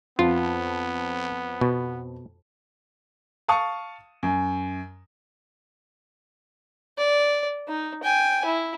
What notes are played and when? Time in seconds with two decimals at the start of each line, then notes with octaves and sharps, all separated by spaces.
0.19 F2 B3 F4
1.61 B2
3.48 F5 A5 C#6 D#6 C#7
4.23 F#2
6.97 D5
7.68 D#4
8.04 G5 G#5
8.45 E4